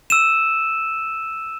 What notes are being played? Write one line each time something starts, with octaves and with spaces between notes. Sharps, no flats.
E6 D#7 E7